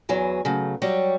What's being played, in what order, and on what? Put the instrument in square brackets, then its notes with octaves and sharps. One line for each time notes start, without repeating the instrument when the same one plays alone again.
[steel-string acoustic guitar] E2 E3 F#3 G#4
C#3 F#3 A3
F#3 G3 G4 C#5